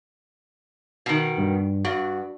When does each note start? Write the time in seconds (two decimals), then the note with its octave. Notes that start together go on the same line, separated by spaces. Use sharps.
1.06 B2 D#3
1.38 G2
1.85 G2 F#4